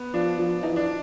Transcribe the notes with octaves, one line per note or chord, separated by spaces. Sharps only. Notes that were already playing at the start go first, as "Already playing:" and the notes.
Already playing: B3
F3 D4
F3
E3 D#4
D4